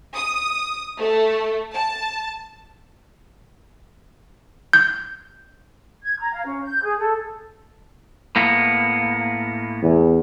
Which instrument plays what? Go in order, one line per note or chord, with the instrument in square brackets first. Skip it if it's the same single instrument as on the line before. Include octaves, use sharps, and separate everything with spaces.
[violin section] D#6
A3
A5
[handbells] G6
[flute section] G#6
A#5
F5
C#4
G6
G#4
A4
[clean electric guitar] A2 A#3 B3
[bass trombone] E2